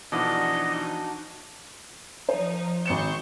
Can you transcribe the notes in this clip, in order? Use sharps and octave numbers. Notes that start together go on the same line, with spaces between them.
B2 E3 F3 D4 D#4 F#4 D#5
F3 D#4 C5
G#1 C5 C#6 G6 C#7 E7